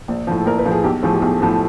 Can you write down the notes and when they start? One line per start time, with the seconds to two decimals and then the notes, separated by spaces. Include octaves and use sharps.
0.08 A#1
0.27 A2 F3
0.40 A4
0.46 A#1 A#4
0.58 B4
0.66 A2 F3
0.72 G#4
0.84 B1 G4
1.03 A2 F3 A3 G#4
1.14 G4
1.22 B1 G#4
1.41 A2 F3 A3